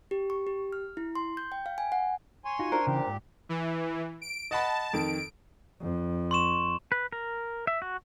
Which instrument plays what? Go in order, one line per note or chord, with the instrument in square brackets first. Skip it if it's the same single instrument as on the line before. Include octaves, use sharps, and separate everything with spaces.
[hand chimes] G4
C#6
G4
F6
E4
C6
G6
G5
F5
G#5
F#5
[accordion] C#5 G#5 C6
[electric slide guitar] D#4 F4 F#4
[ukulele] D4 A#4 C5
[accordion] A#2 G4 [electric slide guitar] C#3 E3
[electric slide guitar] G#2
[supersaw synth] E3
D7
[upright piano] D#5 F#5 B5 [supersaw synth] A5
[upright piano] F2 D#3 [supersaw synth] D7
[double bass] F2
[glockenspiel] C6 C#6 E7
[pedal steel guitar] B4
A#4
E5
F#4